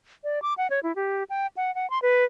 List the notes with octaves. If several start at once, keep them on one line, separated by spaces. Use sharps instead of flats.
D5
D6
F#5
C#5
E4
G4
G5
F#5
F#5
C6
B4